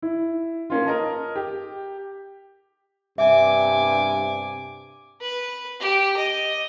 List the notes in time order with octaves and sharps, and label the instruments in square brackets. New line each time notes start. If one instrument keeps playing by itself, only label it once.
[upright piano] E4
A#3 C#4 F4
A#4 D#5 A5
G4
[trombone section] G2 C3 [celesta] E5 [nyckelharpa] G#5 D6
[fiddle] B4
G4
D#5